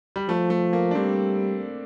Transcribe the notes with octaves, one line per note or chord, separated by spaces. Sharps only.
G3
F3 A3
A3
A#3
D4
G3 C4